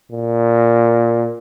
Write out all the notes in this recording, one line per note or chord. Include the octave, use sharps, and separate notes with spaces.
A#2